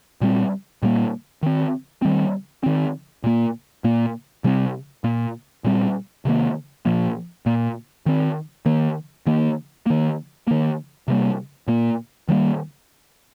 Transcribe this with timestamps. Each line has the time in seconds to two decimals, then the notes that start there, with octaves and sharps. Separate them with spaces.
0.21 A#2 G3 C4
0.83 A#2 G3 A#3
1.43 D#3 C4
2.02 D#3 G3 C4
2.64 D#3 C4
3.24 A#2 A#3
3.84 A#2 A#3
4.44 C3 G3 C4
5.04 A#2 A#3
5.64 A#2 G3 C4
6.25 C3 D#3 A#3
6.85 A#2 F3 A#3
7.46 A#2 A#3
8.06 D#3 C4
8.66 D#3 A#3
9.26 D#3 A#3
9.86 D#3 A#3
10.47 D#3 A#3
11.08 C3 G3 A#3
11.68 A#2 A#3
12.28 D#3 G3 A#3